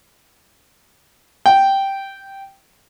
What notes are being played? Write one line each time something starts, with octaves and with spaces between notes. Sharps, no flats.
G5